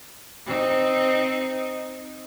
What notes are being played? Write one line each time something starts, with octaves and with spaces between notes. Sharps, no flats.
C4 D#4